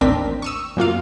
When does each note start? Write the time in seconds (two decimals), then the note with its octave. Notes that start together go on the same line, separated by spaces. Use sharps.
0.01 A1 D#2 C4 D4 A#4 B6
0.42 C#6 D#6 E6
0.77 F#2 A#3 F4 F5